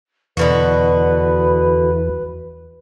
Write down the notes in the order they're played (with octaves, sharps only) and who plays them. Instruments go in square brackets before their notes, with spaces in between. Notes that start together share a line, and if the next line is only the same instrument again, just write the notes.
[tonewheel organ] E2 E3 [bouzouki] B2 D3 F#4 [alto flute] B4